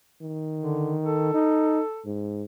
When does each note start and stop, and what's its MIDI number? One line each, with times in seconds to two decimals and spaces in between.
0.22 1.30 51
0.59 0.94 50
1.04 2.04 69
1.34 1.81 63
2.05 2.44 44